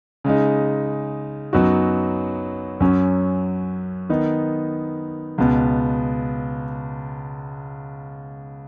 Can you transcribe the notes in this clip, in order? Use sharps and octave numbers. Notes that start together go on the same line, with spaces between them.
C#3 G#3 D#4
F#2 F#3 B3 D#4 F#4
F#2 F#3 C#4
D#3 B3 D#4
C#2 B2 B3